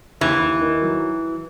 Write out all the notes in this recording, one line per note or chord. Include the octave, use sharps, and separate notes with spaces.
D#2 E3
D#2
D#3
F#3